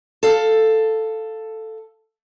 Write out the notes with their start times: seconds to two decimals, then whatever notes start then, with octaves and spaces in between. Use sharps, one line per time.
0.23 A4 F5